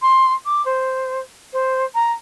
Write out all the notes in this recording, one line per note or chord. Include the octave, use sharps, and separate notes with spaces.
C6
D6
C5
C5
A#5